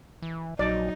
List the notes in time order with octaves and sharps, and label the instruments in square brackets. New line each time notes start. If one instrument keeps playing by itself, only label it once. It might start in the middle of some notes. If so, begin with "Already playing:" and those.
[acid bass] E3
[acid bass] A#1 [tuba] F#3 [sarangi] D#4 [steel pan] D5